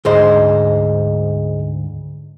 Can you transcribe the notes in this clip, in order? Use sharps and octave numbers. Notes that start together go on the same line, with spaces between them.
D2 G#2 G#4 C5 D#5